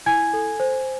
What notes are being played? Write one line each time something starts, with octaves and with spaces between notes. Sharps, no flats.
E4 G#5 G#6
A4
C5